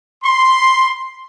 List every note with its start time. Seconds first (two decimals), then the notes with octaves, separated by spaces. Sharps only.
0.23 B5 C6